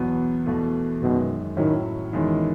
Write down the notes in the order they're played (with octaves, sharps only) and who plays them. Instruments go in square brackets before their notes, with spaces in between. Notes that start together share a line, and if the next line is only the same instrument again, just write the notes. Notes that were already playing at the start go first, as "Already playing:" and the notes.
Already playing: [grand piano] E2 B2 F#3 B3
E2 B2 A3
[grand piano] F#2 D#3 G#3 [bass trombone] B2
[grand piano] A2 F#3 C#4 E4 [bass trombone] D#3
[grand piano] E2 B2 G#3 C#4 E4 [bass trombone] D#3